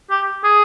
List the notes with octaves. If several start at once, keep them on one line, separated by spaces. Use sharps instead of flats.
G4
G#4